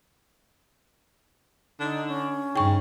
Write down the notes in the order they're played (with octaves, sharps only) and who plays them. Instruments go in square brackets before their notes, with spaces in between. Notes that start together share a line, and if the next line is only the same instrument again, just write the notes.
[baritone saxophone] D3 [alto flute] D#4
[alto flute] C#4
[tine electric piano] G2 D#4 [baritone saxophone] C#3 [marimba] G5 C#6